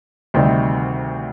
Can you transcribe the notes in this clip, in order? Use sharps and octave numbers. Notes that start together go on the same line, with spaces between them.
D2 C3 D#3 G3